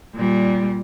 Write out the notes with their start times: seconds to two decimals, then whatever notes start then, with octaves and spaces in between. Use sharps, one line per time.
0.15 A#2 G3